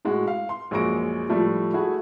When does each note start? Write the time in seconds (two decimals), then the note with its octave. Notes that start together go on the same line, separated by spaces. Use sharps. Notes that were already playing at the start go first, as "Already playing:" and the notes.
0.05 A2 G#3 F#4
0.28 F5
0.49 C6
0.71 A#1 F#2 G#3 C#6 A#6 D7
1.29 A2 F3 G3 A3
1.73 A3 E4 F#4 G#4